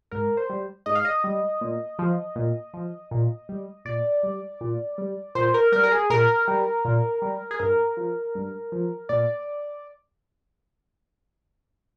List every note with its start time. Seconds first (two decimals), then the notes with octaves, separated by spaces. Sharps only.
0.11 G#2 A#4
0.37 C5
0.50 G3
0.86 G#2 D#5
0.95 F5
1.05 D#5
1.24 G3
1.61 A#2
1.99 F3
2.36 A#2
2.74 F3
3.11 A#2
3.49 G3
3.85 A#2 D5
4.23 G3
4.61 A#2
4.98 G3
5.35 A#2 C5
5.54 A#4
5.72 G3 A#4
5.83 A#4
5.92 G#4
6.10 A#2 A#4
6.48 G3
6.85 A#2
7.22 G3
7.51 G#4
7.59 G2 A#4
7.97 F3
8.35 G2
8.72 F3
9.09 A#2 D5